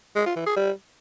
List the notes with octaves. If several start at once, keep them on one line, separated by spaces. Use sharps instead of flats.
G#3
F4
E3
G#4
G3